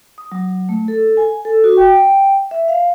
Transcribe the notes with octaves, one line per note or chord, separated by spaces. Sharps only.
D#6
F#3
A3
A4
G#5
A4
F#4
G5
G5
E5
F5